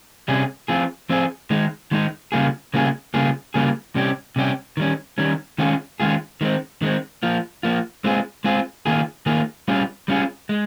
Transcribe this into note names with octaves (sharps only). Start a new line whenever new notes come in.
C3 G3 C#4 G#4
F3 C4 F4 G#4
F3 C4 F4 G#4
D#3 G#3 D#4
D#3 G#3 D#4
C#3 G3 A#3 F4 G#4
C#3 G3 A#3 F4 G#4
C#3 G3 A#3 F4 G#4
C#3 G3 A#3 F4 G#4
C3 G3 C#4 G4
C3 G3 C#4 G4
D#3 G3 C#4
D#3 G3 C#4
D#3 G#3 C#4 F4 G#4
D#3 G#3 C#4 F4 G#4
D#3 G#3 C4
D#3 G#3 C4
F3 A#3 F4
F3 A#3 F4
G#3 C4 F4 G#4
G#3 C4 F4 G#4
D#3 A#3 F4 G#4
D#3 A#3 F4 G#4
G3 C#4 F4 G#4
G3 C#4 F4 G#4
G#3